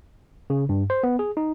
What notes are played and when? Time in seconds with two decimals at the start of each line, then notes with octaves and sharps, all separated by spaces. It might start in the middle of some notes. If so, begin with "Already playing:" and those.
0.50 C#3
0.69 G2
0.90 C5
1.03 B3
1.19 G#4
1.37 D#4